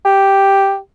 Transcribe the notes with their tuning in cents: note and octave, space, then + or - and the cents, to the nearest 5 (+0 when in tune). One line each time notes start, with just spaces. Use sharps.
G4 +0